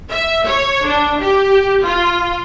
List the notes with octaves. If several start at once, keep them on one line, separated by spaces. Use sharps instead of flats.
E5
C#5
D4
G4
F4